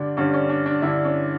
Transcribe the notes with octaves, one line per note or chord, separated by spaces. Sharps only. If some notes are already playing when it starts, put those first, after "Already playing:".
Already playing: G2 D3 G3 D4
G2 D3 G3 C#4
C#4
D4
D4
G2 D3 G3 E4
C#4